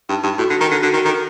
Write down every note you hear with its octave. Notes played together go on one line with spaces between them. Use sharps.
G2 D#4
G2 D#4
A2 F#4
D3
D#3 D#4
D3
D3 F#4
D#3
D#3 A4